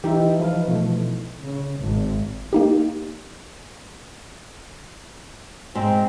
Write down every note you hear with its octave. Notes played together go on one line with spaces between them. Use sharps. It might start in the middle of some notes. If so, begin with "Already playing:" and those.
E3 D#4 E4 G4 E5
F3 B4 F5
B2 F3 A3
C#3
G#1
A#3 D#4 G4
G#2 C4